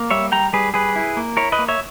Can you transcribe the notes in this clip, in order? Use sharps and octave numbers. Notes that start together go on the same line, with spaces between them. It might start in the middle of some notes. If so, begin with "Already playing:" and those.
Already playing: A#3
G3 C#5 E5
G3 G5 A#5
G3 G#4 B4
G3 G#4 B4
E4
A#3
E4 A#4 C#5
B4 D#5
A#3
C#5 E5